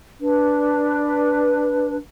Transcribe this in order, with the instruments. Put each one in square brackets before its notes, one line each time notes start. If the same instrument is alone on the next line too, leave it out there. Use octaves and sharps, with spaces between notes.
[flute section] D4 B4